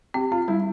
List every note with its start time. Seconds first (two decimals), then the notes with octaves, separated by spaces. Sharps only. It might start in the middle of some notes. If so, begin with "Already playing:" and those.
0.14 C4 G4
0.32 C4 F4
0.48 G3 E4